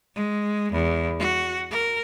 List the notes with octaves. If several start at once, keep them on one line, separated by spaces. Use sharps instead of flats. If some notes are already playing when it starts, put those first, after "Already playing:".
G#3
E2
F#4
A#4